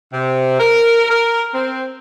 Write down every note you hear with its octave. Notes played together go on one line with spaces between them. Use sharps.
C3
A#4
A#4
C4